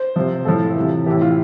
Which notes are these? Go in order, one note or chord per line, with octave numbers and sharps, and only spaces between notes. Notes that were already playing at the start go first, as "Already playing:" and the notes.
Already playing: C5
C3 F3
A2 F3 A4
C3 E3
A2 E3 G4
F4